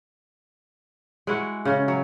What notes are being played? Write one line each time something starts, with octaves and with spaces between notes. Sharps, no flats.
G#3 E4 F#4
C#3 C#4
F#3